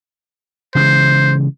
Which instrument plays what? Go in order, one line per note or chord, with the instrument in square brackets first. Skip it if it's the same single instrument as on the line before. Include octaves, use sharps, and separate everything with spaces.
[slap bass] C#3 E3 G#3 [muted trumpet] C5